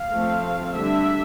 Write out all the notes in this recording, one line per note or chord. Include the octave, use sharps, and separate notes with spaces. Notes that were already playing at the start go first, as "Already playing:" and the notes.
Already playing: F5
F3 A3 C4
D3 G3 D4 E5